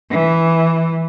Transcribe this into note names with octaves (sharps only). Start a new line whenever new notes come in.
E3